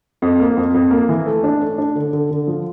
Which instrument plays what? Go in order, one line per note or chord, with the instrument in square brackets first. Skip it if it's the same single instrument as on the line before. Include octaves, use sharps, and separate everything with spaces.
[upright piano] F2
A#3
F2
F2
A#3
E3
A3
D4
A3
D4
D3
D3
D3
F3